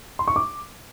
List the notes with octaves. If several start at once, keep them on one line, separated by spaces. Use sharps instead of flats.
C6
C#6
D6